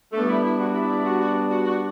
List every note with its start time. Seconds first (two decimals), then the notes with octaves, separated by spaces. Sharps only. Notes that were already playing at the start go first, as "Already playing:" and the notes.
0.12 G3 A3 B3 D4
0.27 E4
0.43 E4
0.59 F#4
0.74 E4
0.89 E4
1.04 F#4
1.20 F#4
1.50 F#4
1.65 F#4